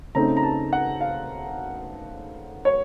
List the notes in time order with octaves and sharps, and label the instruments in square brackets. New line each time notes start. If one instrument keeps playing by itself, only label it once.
[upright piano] C#3 A3 C4 D#4 A#5
A#5
A5
F#5
F5
C#5